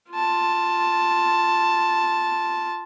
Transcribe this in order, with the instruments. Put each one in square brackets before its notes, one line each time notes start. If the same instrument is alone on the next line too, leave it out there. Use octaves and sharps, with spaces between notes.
[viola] F4 A5